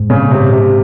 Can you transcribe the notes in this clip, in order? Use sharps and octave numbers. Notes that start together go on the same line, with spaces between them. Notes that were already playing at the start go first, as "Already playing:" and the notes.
Already playing: G#2
C#3
C3
C3